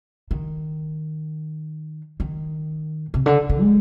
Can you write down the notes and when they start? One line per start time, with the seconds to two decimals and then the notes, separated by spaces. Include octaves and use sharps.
0.31 D#3
2.20 D#3
3.14 C3
3.26 D3
3.49 D3
3.61 G#3